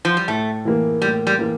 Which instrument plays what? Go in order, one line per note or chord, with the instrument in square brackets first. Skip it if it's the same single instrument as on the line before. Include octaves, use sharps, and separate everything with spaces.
[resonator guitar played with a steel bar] F3
G3
[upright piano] A2 [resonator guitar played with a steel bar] A3
[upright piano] E3 A#3
[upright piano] A2 [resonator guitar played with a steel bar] G3
[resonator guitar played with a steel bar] G3
[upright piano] E3 A#3